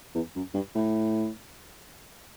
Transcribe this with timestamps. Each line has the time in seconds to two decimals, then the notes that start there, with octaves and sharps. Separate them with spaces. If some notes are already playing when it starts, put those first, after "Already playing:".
0.15 E2
0.36 F#2
0.54 G2
0.75 A2